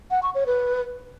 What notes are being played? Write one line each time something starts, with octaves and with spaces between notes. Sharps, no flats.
F#5
C#6
C#5
B4